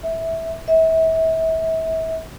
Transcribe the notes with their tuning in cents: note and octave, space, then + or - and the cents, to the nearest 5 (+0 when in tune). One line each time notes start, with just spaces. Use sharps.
E5 -10
E5 -35